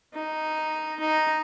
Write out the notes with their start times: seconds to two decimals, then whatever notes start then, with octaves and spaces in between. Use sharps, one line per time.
0.14 D#4
1.00 D#4